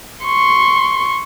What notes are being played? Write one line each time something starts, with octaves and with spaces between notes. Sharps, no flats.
C6 C#6